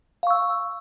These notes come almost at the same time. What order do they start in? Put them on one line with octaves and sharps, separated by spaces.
F5 C#6 E6